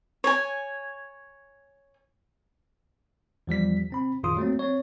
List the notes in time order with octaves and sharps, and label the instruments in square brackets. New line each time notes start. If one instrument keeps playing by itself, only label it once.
[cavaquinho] C#5 G#5
[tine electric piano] E2 F3 G3 B6
C3 C4 B5
A#1 F#2 D#3 F4 C6 D#6
F#3 A3 A#3 C4
C4 C#5